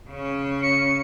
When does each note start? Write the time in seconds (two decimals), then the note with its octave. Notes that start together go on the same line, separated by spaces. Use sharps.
0.10 C#3 C#4
0.63 C#7